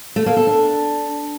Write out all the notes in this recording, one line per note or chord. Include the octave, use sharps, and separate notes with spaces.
A3
A#3
A4
D4